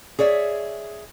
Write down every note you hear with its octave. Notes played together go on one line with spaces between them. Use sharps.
G#4 C#5 D5 E5